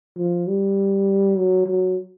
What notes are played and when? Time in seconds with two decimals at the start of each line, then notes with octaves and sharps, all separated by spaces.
0.18 F3
0.48 G3
1.37 F#3
1.67 F#3